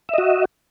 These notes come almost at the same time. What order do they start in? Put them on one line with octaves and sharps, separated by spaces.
E5 D#5 F#4